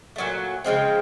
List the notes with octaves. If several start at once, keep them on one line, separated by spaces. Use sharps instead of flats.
A#2 F#3 A3
C#3 F3 G#3 C4